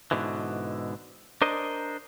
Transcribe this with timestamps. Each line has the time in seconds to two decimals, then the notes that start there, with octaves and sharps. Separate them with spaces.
0.11 G#2 B2 D3 E3
1.42 D4 A#4 C5 D#5